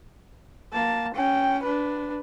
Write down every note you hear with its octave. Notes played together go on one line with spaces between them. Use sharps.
A#3 A5
C#4 G5
D4 B4